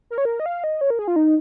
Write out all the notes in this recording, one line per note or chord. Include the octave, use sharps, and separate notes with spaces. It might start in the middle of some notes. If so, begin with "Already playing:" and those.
A#4
C#5
A#4
D#5
F5
D#5
C#5
A#4
G#4
F4
D#4